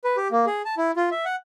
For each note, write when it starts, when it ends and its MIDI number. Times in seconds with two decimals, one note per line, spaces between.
0.04 0.16 71
0.17 0.28 67
0.31 0.45 58
0.47 0.62 68
0.65 0.75 81
0.77 0.91 64
0.96 1.09 65
1.11 1.25 76
1.25 1.36 78